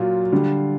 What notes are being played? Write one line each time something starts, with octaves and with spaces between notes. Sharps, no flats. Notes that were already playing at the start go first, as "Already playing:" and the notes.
Already playing: A#2 F#3 F4
D3 G3